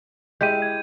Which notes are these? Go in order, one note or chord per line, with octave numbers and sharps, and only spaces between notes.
G#3 E4 G4 G6 D#7
G#6